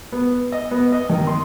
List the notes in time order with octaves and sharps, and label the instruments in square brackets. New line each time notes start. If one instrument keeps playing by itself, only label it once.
[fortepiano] B3
D#5
B3
D#5
D#3
C6